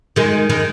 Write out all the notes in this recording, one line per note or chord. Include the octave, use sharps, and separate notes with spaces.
D#3 G#3
D#3 G#3